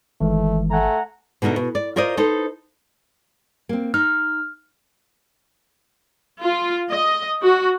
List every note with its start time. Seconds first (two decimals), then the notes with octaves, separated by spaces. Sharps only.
0.21 G1 D#3 E3 G#3 A3
0.71 A3 F#5 G#5 A#5
1.42 B2 D3 D#4 E4 A#4
1.56 B2
1.75 D5
1.96 F4 A#4 C5 D5 D#5
2.17 D#4 A4 B4 C5
3.69 A#3 C4
3.94 D#4 F6
6.42 F4
6.89 D#5
7.43 F#4